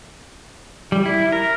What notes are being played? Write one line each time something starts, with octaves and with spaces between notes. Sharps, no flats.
G3
E4
A#4